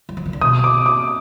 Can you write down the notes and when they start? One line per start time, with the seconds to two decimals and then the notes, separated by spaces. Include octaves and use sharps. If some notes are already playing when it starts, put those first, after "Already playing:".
0.09 F#3
0.17 F3
0.26 D#3
0.33 D3
0.41 B2 D#6
0.64 D6
0.86 D6